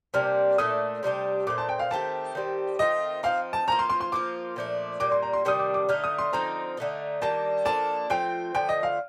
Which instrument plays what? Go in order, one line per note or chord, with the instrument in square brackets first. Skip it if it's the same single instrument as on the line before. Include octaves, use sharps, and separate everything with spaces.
[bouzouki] C3 G3 A#3 D4 [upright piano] F6
[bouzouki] A#2 A3 D4 A4 [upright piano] D#6
[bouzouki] C3 G3 D4 G4
[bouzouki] A#2 A3 C4 [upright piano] D6
[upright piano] A5
G5
F5
[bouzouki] D#3 A3 C4 G4 [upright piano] A5
[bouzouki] D#3 G3 C4 G4
[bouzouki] D#3 A3 C4 F4 [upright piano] D#5
[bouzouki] F3 C4 D#4 [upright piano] F5
[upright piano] A5
[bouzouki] F3 A#3 F4 [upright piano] A#5
[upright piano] C6
C6
C6
[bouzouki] F3 A#3 F4 [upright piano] D6
[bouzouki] A#2 F3 A3 D4
[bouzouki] A#2 G3 A#3 [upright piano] D6
[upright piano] C6
A#5
C6
[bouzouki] C3 D#3 G3 D4 [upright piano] D#6
[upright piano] D6
D6
[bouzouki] D3 A3 D#4 [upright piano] F6
[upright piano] D#6
C6
[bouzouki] D3 F3 C4 D#4 [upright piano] A#5
[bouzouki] D3 A3 D#4
[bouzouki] D#3 G3 A#3 D4 [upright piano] A5
[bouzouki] F3 A#3 D4 A4 [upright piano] A5
[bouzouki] F3 A3 C4 F4 [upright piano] G5
[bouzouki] D3 F3 A3 [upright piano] G5
[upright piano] D#5
F5